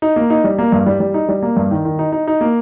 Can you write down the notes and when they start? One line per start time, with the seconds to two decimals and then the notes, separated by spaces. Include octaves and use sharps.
0.02 D#4
0.16 A#3
0.30 D#4
0.44 G3
0.59 A#3
0.72 G2
0.86 G3
1.00 G3
1.14 D#4
1.29 G3
1.43 A#3
1.57 G2
1.71 D#3
1.85 D#3
1.99 D#4
2.12 D#4
2.27 D#4
2.41 A#3